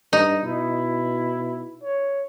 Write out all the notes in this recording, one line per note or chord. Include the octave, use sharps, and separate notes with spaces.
G2 D#4
B2 E4
C#5